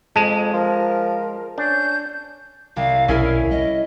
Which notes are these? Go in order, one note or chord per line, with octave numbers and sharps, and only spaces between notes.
F2 G#3 A5
F3 A#4
C#4 D4 G6
C2 F5
B1 C#4 E4 G#4 A#4
D2
G3 D#5